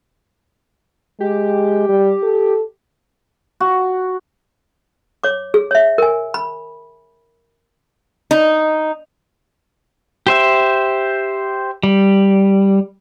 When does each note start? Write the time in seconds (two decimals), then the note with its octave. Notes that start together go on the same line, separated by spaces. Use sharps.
1.20 G#3 G4
1.89 G3
2.23 A4
3.60 F#4
5.24 C#5 D6
5.54 G#4
5.71 C#5 E5
5.98 A#4 G#5
6.34 B5
8.31 D#4
10.27 G4 C5 E5
11.83 G3